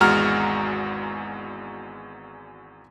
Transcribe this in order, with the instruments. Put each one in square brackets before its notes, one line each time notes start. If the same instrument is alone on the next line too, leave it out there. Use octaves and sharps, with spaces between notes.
[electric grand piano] G#1 E2 G#3 F#4 A#5 F6